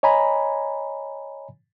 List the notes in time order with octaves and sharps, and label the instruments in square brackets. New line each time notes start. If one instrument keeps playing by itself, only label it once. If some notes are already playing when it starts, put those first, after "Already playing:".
[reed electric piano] C#5 D#5 G#5 A#5 B5